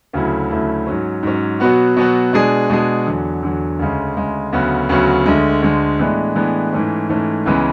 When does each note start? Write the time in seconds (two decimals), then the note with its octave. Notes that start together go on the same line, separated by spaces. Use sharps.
0.13 D2 C#3 F#3 A3 E4
0.50 D2 C#3 F#3 A3 E4
0.87 G#2 F#3 C#4
1.23 G#2 F#3 C#4
1.60 B2 F#3 B3 F#4
1.97 B2 F#3 B3 F#4
2.33 B2 G#3 D4 G#4
2.70 B2 G#3 D4 G#4
3.06 E2 D3 F#3
3.43 E2 D3 F#3
3.79 D2 C#3 G#3
4.16 D2 C#3 G#3
4.53 D2 C#3 F#3 B3 F#4
4.89 D2 C#3 F#3 B3 F#4
5.26 D2 D3 G#3
5.62 D2 D3 G#3
5.99 A2 E3 G#3 B3 D4
6.35 A2 E3 G#3 B3 D4
6.72 G#2 E3 A3 C#4
7.09 G#2 E3 A3 C#4
7.46 C#2 C#3 E3 G#3 B3